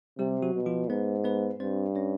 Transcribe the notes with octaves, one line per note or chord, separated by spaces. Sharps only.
C3 G3 G4
F#3 F#4
B2
F3 F4
G#2 B3 B4
B3 B4
G2 C4 C5
C#4 C#5